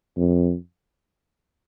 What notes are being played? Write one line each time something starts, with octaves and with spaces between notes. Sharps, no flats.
F2